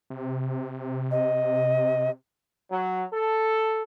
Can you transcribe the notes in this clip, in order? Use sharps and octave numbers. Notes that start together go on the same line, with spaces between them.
C3
D#5
F#3
A4